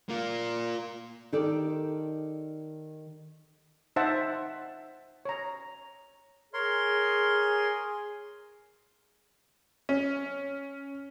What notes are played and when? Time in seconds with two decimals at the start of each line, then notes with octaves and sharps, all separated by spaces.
0.09 A#3 F4
1.32 D#3 G4 A4 A#4 D5
3.96 D#4 C5 E5 F#5 A5
5.25 C#5 A#5
6.54 G#4 A#4 C#5 C6
9.89 C#4